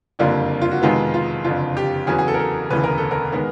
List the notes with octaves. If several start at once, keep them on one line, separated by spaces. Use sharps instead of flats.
F#1 F2 D3 G3 A#3 F4
F4
F#4
F2 C3 D#3 G#3 B3 F4
F4
F#1 F2 D3 F4
G4
E2 C#3 F#3 B3 G#4
G#4
A4
A#4
A4
E1 D2 C#3 E3 B4
A#4
A4
A#4
D#3 G#3 B3